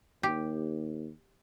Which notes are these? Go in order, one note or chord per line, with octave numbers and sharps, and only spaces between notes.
D#2 G4